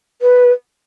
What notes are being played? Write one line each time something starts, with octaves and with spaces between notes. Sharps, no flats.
B4